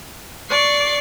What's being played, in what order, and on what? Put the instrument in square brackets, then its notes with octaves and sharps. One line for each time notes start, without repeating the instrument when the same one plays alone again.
[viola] D5 [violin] C#6 C7